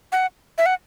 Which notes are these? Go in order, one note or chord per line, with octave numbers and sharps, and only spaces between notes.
F#5
E5
F#5